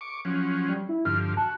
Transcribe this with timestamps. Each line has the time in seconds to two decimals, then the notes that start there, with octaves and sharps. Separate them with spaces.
0.01 C#6 D6
0.25 F3 F#3 C#4
0.69 G3
0.89 E4
1.05 G2 D3 F3 F6
1.37 F#4 A5